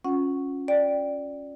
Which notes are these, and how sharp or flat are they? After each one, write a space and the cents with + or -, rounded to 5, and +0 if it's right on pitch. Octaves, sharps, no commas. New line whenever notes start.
C#4 +0 F4 +35 F#5 +5
D5 +0 G5 +0